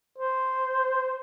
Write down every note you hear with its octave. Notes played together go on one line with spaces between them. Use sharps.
C5